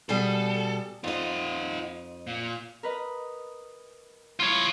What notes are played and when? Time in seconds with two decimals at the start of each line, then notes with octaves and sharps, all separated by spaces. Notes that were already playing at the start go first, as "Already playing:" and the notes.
0.09 B2 G3 G#4 A4
1.04 F2 D#4 F4 D#5
2.27 A#2
2.83 A#4 B4 D#5
4.40 F3 E4 F4 C#5